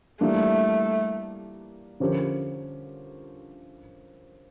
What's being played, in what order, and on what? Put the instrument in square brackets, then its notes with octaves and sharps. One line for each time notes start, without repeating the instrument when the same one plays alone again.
[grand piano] E3 G3 A#3 D4 F4 [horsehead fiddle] A3
[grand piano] D3 F3 C#4 G4 A#4